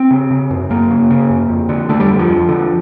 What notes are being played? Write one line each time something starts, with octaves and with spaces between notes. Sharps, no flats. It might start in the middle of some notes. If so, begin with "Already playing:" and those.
Already playing: C4
C#3
C#3
F#2
F#2 A#3
C#3
C#3
F#2
F2
D3
D3 A3
G3
F2
F3
F2
D3